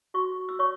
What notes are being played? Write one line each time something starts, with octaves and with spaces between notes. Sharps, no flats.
F#4 C#6
E6
C#5 C#6